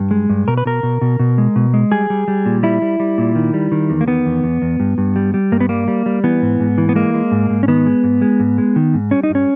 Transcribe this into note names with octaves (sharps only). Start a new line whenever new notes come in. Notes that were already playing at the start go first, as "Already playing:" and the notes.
Already playing: G2
G#3
G2
B2 A#4
B4
B2 A#4
B2
B2
B2
G#3
B2
G#3
G3 G#4
G3
G3
A#2
G3 E4
G3
G3
A#2
D#3
G3
D#3
E2
A#3
D#3 B3
E2
E2
E2
G2
G2
G3
G3
G2 A#3
B3
G3 A#3
G3
G3
E3 B3
G#2
G#2
E3
B3
G#3 A#3
G#3
G#2
G#2
C#4
D#3 B3
G#3
G#2
G#3
G#2
G#3
D#3
G#2
G3 C#4
D#4
G2
C#4